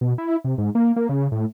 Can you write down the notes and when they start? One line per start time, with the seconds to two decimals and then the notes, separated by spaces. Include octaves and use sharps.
0.01 B2
0.18 E4
0.44 C3
0.58 G#2
0.75 A#3
0.96 A#3
1.09 C#3
1.32 A2